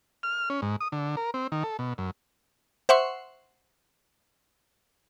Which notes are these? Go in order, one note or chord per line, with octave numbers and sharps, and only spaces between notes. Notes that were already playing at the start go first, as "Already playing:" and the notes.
F6
C#4
G#2
D#6
D3
A#4
C4
D#3
A4
B2
F#2
C5 E5 F#5 C6 C#6